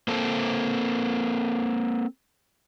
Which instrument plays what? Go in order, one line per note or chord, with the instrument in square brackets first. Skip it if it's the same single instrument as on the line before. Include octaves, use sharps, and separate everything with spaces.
[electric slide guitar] A#3 C4 A4